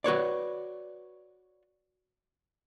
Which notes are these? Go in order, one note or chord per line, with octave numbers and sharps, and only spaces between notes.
F#4 B4 C#5 D5